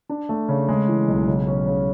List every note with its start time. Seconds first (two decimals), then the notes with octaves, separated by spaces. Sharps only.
0.09 D4
0.29 A3
0.48 C#3
0.69 G#3
0.88 E3
1.08 B1
1.27 C#3
1.47 C#4
1.66 C#3